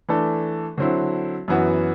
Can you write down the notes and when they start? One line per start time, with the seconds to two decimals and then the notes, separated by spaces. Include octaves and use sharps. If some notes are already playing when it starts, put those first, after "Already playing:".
0.09 E3 A3 D4 A4
0.78 D3 F#3 C4 E4
1.48 F#2 E3 B3 F#4